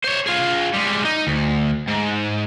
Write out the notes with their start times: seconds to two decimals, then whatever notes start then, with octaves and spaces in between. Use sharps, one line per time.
0.04 C5 C#5
0.26 F4 G#4
0.73 G3 G#3
1.05 D#4
1.27 D2
1.88 G#2